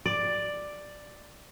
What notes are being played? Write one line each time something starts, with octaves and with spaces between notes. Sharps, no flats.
D5